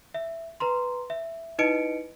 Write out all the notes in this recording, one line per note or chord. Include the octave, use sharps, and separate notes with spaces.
E5
B4 A#5 C6
E5
D#4 E4 B4 D#5 C#7 D7